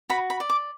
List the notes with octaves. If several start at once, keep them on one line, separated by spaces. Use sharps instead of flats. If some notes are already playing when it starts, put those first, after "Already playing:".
F#4 B5
B5
D5
D6